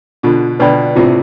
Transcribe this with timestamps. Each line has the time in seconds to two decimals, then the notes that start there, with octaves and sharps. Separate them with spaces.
0.23 B2 D3 F4
0.59 B2 D3 B4 D5 G5 B5
0.96 A2 C3 F4